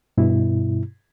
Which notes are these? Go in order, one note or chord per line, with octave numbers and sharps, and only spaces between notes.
G2 B2 E4